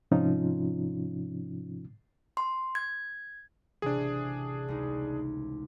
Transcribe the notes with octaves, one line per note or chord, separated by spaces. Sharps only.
G#2 C3 F3 C#4 D#4 F4
C6
G#6
A1 C3 D4 G#4
C#2 D#4